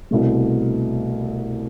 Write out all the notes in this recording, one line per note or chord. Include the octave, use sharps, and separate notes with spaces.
C2 B2 A3